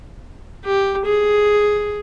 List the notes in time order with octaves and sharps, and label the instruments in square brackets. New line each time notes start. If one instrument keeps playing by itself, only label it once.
[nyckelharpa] G4
G#4